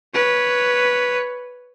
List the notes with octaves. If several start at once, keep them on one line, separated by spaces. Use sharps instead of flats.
B4 C#5